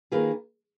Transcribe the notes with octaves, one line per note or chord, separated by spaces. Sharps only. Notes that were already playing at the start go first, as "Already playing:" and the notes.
D#3 A#3 F4 G#4 B4